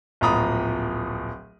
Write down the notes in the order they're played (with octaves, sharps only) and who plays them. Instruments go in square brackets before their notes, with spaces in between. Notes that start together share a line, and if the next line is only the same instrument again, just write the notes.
[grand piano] D1 A#1 F4 A#5 B5 D#6